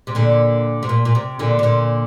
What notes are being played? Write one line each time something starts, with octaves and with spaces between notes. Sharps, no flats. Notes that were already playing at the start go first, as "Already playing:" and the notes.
C3
A#2 D3
C3
A#2
A#2
C3
A#2 D3
C3
A#2 D3